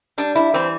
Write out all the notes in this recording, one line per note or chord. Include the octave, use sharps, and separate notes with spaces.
G3 D4
E4
E3 C4